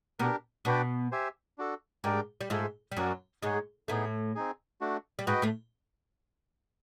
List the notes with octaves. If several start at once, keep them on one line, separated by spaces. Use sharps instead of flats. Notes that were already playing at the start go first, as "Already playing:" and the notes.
B2 B3 D4 G4 A#4
B2 B3 D4 F#4 B4 D5 G5
G4 C5 E5 G#5
D4 F#4 A4
G#2 G#3 D4 G4 A#4 D5 G5
G3
G#2 G#3 F4 A4 C5 E5 G#5
G3
F#2 F#3 C#4 F#4 A#4 D5
G#2 G#3 D#4 G#4 C#5 F#5
A2 A3 B3 D#4 G#4
C4 D#4 G#4
A3 D4 F#4
G3
G#2 G#3 F#4 B4 D#5 G5
A2 A3